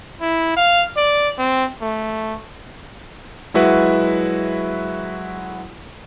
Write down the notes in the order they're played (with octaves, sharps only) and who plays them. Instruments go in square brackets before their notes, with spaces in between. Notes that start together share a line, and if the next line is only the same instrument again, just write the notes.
[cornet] E4
F5
D5
C4
A3
[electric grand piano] F#3 G#3 E4 F#4 B4 E5